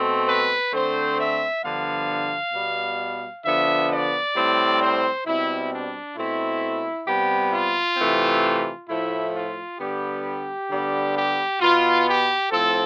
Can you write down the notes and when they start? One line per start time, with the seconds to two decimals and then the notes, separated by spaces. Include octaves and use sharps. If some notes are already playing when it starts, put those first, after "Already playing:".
Already playing: B2 A3 C4
0.27 B4
0.72 D3 A3 C4 C5
1.18 E5
1.63 G2 D3 F3 B3 F5
2.53 B2 G3 B3
3.44 D3 F3 B3 E5
3.90 D5
4.36 A2 G3 C4
4.81 C5
5.25 B2 G3 C4 E4
5.71 D4
6.16 B2 A3 C4 E4
7.06 C3 G3 B3 G4
7.52 F4
7.97 C3 E3 A3 C4
8.89 A2 F3 A3 E4
9.34 F4
9.79 D3 G3 B3 G4
10.69 D3 G3 B3
11.16 G4
11.60 B2 B3 F4
12.06 G4
12.51 A2 F3 C4 A4